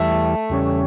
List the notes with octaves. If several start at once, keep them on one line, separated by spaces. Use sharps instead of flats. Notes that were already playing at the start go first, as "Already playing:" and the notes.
Already playing: E2 E3 G3 A3
E2 C#3 G3 C#4